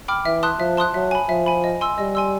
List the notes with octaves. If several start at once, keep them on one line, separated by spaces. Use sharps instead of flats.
G5 B5 D6 F6
E3 E5
A5 C6 D#6 F#6
F3 E5
A5 C6 D#6 F#6
F#3 E5
G#5 B5
F3 E5
G#5 B5
D#5
G#5 C6 E6
G3 D#5
G#5 C6 E6